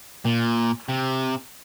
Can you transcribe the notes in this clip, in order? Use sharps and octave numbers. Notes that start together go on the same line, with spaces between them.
A#2
C3